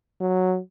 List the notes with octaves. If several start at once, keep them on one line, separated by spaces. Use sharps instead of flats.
F#3